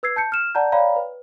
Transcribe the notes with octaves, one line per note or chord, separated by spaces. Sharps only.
B4 E6 G#6 C7
A5 G6 C#7
F6 E7
D5 F#5 A5 A#5 G6
C#5 D5 F5 G5 A#5 B5
B4